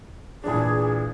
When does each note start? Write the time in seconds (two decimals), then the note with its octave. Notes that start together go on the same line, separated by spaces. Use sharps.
0.44 A#2 E3 D4 G#4